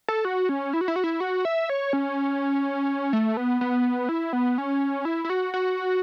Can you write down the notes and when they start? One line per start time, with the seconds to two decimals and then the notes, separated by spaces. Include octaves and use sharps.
0.08 A4
0.25 F#4
0.49 C#4
0.73 E4
0.81 F#4
0.88 E4
0.96 F#4
1.04 E4
1.20 F#4
1.45 E5
1.69 C#5
1.93 C#4
3.13 A3
3.37 B3
3.61 B3
4.09 E4
4.33 B3
4.58 C#4
5.05 E4
5.25 E4
5.30 F#4
5.54 F#4